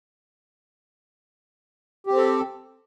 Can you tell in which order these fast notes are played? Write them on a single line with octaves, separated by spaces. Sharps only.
G4 C4 A4